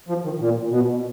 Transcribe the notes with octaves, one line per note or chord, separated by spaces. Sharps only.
F3
D#3
A#2
B2